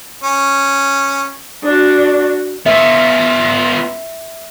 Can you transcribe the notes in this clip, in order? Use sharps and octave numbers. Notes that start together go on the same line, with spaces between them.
C#4
D4 F#4
B3 F4 E5